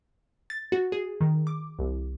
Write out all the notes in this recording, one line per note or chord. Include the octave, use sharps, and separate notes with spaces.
A6
F#4
G#4
D#3
D6
C2